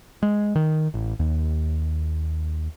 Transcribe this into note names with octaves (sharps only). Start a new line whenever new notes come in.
G#3
D#3
A1
D#2